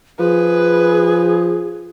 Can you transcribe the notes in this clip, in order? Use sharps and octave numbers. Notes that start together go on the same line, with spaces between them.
F3 G#4 B4